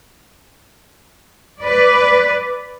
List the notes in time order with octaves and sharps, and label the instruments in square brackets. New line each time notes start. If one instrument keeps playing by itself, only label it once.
[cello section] B4 D5